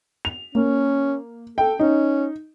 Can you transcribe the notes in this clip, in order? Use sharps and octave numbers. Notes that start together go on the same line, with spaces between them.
F7
A#3 C#4
A4 G5
C#4 D#4